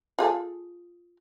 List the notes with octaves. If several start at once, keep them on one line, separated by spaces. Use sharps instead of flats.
F4 G#4 A4